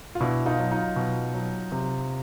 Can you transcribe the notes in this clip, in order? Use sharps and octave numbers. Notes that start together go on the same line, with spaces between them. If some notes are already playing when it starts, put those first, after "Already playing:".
F4
B2 D4 E4
D#4 F4
F#3
D#4 F4
B2
F#3
C3